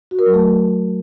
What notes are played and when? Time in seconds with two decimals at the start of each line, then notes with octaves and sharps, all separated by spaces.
0.11 F#4
0.19 A#4
0.26 F#3
0.34 A3